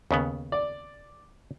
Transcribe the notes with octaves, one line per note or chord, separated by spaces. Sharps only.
D#2 C#3 B3
D5